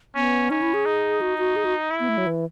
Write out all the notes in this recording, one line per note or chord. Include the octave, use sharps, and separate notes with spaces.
B3 C#4
C#4 D#4
E4
G#4
D#4
F#4
F#4
G#4
F#4
E4
B3
A3
F#3
E3